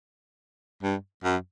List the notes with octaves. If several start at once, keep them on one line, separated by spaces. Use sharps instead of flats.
G2
F#2